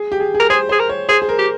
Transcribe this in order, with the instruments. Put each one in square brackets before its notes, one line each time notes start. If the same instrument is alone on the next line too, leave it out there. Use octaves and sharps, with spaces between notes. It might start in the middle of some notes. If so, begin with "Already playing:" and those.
Already playing: [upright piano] G#4
G4
G#4
G#4
[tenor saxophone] A#4
[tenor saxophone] G#4 [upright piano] C5
[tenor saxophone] G#4 [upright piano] C5
[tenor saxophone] A#4
[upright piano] C#5
[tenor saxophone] G#4 [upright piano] C5
[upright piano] G#4
A#4
[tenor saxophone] G4